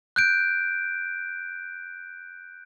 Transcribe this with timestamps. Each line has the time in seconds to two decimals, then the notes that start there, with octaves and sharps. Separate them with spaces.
0.16 F#6 G6 D7